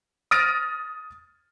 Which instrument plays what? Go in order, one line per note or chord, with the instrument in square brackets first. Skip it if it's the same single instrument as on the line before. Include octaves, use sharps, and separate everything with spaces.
[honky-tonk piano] D#6 F6 A6 A#6 D7 D#7